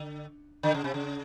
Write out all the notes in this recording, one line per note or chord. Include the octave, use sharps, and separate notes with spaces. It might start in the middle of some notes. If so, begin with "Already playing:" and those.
Already playing: D3
D3
C#3
C3
C#3